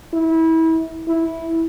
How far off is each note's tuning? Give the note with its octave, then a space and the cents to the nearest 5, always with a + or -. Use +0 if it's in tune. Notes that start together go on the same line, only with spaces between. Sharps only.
E4 -25
E4 -10